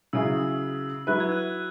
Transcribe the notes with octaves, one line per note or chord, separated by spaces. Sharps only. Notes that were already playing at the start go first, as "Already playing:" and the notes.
C#3 F#3 E4 G#4 E6
F#3 E4 B4 F#6
G#6
F#6